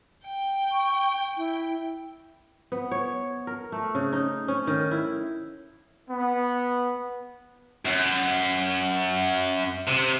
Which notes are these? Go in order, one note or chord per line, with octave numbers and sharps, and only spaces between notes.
G5
C#6
E4
B3
C#5
A#4
A3
C#3
D#4
C#4
D#3
E4
B3
F#2
C3